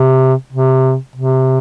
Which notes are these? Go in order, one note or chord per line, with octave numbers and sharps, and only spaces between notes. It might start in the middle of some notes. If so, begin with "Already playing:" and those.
Already playing: C3
C3
C3